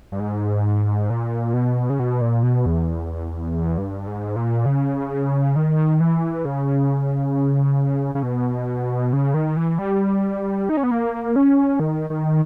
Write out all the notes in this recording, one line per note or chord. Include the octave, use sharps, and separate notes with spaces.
G2
G#2
A#2
B2
C#3
B2
A#2
B2
E2
G2
G#2
A#2
C#3
D#3
E3
C#3
C#3
B2
C#3
D#3
E3
G3
D#4
C#4
B3
A#3
C#4
D#3
D#3